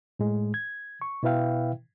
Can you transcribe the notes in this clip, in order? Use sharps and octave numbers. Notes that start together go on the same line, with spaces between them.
A2 G#3
G#6
C#6
B2 E4 B4 E5 F5 G5